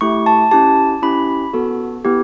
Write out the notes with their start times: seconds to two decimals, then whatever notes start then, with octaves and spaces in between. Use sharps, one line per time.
0.01 A3 E4 G4 C#6
0.26 A5
0.51 C#4 E4 G4 A5
1.02 C#4 E4 G4 B5
1.53 B3 F#4 A4
2.05 B3 E4 G4